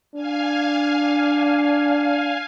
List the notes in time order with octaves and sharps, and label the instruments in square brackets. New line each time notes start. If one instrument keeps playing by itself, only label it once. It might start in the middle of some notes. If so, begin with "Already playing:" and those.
[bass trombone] D4 [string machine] F5 G#5